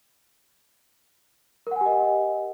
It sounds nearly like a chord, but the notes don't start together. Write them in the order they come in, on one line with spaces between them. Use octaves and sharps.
A#4 F#5 G#5 G4 D#5